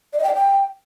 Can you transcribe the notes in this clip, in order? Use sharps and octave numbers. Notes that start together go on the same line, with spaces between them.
D5
D#5
G5
D5
G5